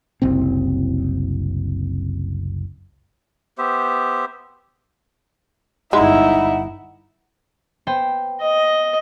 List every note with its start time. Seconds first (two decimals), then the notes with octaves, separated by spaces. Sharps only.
0.22 F#1 C2 C4
3.58 B3 G4 C5 E5
5.93 G1 G#3 D#4 E4 E5 F#5
7.87 B3 C5 G5
8.42 D#5